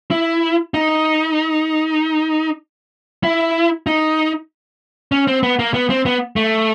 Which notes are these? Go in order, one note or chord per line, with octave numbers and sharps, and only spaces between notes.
E4
D#4
E4
D#4
C#4
C4
B3
A#3
B3
C4
B3
A3